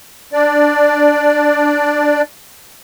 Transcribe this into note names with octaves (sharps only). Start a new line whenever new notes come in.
D4 D5